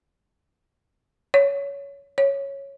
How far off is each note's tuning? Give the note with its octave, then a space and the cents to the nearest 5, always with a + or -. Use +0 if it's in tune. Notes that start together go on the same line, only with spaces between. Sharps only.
C#5 +15
C#5 -5